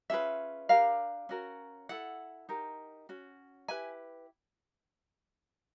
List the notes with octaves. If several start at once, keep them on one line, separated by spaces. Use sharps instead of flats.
C#4 F4 G#4 B4 E5
D4 G4 A#4 F5
C#4 F#4 A#4
E4 A4 F#5
D#4 G4 A#4
C#4 F#4
E4 G4 B4 G#5